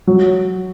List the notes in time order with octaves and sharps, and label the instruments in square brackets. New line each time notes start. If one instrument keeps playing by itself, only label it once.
[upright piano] F#3